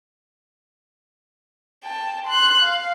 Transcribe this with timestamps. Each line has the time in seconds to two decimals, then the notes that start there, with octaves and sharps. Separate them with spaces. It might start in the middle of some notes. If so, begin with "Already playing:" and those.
1.84 G5 A5
2.26 C6 F#6
2.61 F5